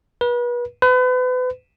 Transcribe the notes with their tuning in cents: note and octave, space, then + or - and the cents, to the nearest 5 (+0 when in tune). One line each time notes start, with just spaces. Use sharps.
B4 -35
B4 +35